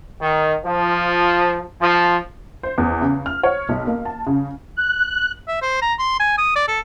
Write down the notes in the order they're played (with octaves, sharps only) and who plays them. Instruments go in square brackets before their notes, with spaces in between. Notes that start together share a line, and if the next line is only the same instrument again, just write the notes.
[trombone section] D#3
F3
F3
[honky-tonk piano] C5
E2
C#3
F6
C#5
B1
A#3
A5
C#3
[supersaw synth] F#6
[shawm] E5
C5
A#5
C6
G#5
D#6
D5
A4